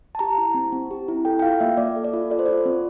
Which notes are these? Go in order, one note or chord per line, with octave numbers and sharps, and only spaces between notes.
A5
G4 A#5
E4
C4
C4
G4
E4
A4 G5
G5
F4 F5
A#3 E5
A#3 D5
A4
D5
F4
A4 D5
C5
F4 D5
C4